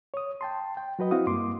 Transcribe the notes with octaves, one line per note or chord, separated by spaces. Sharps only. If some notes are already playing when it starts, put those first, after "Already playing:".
C#5 D#6
G5 A5 C6
G5
F#3 F#4 B4 D#5
C4 E4 F#4 F5 D#6
G2 A#3 C6 D6